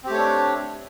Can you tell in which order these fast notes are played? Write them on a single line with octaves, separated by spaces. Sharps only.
C4 G4 A3 C#5 D4